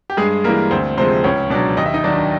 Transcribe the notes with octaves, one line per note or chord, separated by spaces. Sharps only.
G4
G2 G#3 G#4
E3 G3 A#3 A#4
D2 C4 C5
C3 F3 G#3 C4 C5
C#2 C#4 C#5
B2 F#3 D4 D5
D#2 D#5
E5
D#4 D#5
D#3 F#3 D4 D5